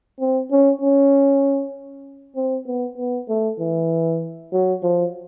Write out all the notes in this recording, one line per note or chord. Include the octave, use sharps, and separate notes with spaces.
C4
C#4
C#4
C4
B3
B3
A3
E3
F#3
F3